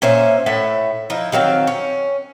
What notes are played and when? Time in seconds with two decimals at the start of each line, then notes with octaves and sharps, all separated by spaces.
0.02 A#2 C#4 C5 E5
0.46 A2 E5 F#5
1.10 F3 D#4 E4
1.32 D#3 F#3 C4 F5
1.67 C#4